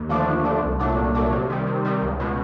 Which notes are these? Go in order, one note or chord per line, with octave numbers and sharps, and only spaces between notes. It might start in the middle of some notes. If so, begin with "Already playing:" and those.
Already playing: D#2
D3 F3 A3 D4
D#2
D3 F3 A3 D4
C2
A#2 F#3 A3 D4
C2
A#2 F#3 A3 D4
C3
D#3 G3
C3
D#3 G3
C#2
B2 G#3